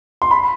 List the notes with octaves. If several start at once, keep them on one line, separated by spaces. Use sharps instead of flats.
C6
B5